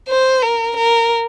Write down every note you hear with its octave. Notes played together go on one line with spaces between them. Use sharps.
C5
A#4
A#4